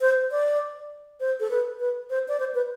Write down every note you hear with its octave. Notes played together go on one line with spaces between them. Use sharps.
C5
D5
C5
A4
B4
B4
C5
D5
C5
B4